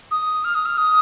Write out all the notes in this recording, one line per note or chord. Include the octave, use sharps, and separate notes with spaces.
D#6
F6
D#6
F6
D#6